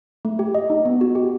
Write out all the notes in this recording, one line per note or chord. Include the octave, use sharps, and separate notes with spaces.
A3
G4
D#5
D#4
B3
F#4
G4